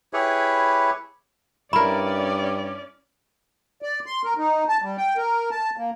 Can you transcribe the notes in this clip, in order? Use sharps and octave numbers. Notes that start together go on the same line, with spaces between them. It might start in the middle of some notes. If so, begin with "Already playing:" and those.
E4 G4 G#4 B4 C#5 E5
G2 C#4 E4 A#4 D5 B5
D5
C6
A#4
D#4
A5
G3
G5
A#4
A5
A#3